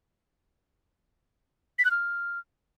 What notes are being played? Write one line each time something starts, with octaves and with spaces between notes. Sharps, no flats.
B6
F#6
F6